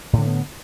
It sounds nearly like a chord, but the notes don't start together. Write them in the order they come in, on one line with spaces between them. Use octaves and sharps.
A2 D3 A#3 B3